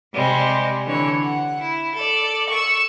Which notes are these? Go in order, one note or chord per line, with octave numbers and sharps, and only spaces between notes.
C3 G3 G#3
D3 E3 C#5
F#5
E4
A4 D5
C#6 E6